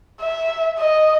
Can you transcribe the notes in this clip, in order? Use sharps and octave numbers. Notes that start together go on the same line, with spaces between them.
E5
D#5